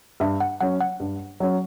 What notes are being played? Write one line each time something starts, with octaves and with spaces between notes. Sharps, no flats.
G2 E5
F#5
F#3 C#4 F#5
F#5
G2
F#3 C#4